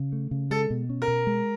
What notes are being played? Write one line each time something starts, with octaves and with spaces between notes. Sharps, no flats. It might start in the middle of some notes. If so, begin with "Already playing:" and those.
Already playing: C#3
A3
C#3
G#3 A4
B2
C#4
A#4
B2
G#3